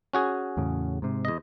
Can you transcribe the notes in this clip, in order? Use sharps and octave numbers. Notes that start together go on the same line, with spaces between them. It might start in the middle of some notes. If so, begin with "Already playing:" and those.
C#4 F#4 G#4
E2 A2 C#3
G#2 C3
E2 D#5